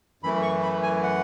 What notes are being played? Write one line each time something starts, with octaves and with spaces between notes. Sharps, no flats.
F#2 E3 A3 B5
C#6
B5
G#5
F#5